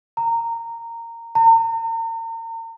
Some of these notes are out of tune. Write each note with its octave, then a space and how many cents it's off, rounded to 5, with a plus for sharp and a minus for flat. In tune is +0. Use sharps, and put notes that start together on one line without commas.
A#5 -15
A#5 -40